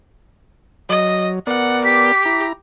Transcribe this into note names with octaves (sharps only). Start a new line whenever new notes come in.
F#3 D#5
B3 A#4 D5 F#5
G4 B6
E4 A#5